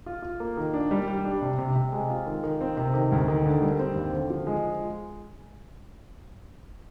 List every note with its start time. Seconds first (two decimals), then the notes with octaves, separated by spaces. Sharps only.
0.06 F4
0.22 F4
0.40 A#3
0.57 D#3
0.74 D4
0.91 G3
1.08 G3
1.25 D4
1.42 C3
1.58 C3
1.76 C3
1.92 G#3
2.10 F4
2.27 D#3
2.44 D#3
2.61 C4
2.77 C3
2.94 D#3
3.12 D2
3.28 D#3
3.46 D3
3.62 G3
3.79 C4
3.96 D#2
4.13 D3
4.30 F3
4.47 G#3